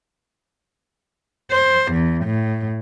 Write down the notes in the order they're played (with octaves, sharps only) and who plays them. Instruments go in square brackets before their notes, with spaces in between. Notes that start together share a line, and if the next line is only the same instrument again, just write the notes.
[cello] C5
E2
A2